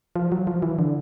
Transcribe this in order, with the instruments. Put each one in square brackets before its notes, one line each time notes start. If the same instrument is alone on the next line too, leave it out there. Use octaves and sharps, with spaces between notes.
[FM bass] F3
F#3
F3
E3
D3